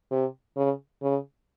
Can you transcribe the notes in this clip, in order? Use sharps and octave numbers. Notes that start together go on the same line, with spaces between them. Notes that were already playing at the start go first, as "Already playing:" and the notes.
C3
C#3
C#3